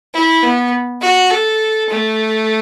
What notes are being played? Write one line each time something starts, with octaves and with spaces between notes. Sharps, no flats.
E4
B3
F#4
A4
A3